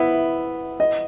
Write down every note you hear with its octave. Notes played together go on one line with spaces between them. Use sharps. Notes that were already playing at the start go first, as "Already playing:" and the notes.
Already playing: B3 E4 E5
D#5